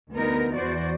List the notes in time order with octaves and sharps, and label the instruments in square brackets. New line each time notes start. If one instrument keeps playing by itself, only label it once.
[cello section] D2 D3 B3 D#4 A#4
E2 E3 F#4 C5 D5